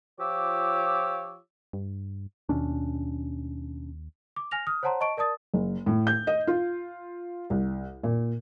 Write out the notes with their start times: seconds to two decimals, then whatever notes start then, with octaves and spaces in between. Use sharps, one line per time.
0.19 F3 F4 G4 C#5 D6 E6
1.73 G2
2.49 D#2 B2 C#4 D4
4.36 D6
4.51 G#5 F6 A#6 F7
4.67 D#6 F6
4.83 C5 C#5 F#5 A5 A#5 C6
5.01 D#5 A5 C#6 D7
5.17 A#4 D5 A5 D#6 A6
5.54 F#1
5.86 A2
6.07 G6
6.27 D#5
6.47 F4
7.50 C2
8.03 A#2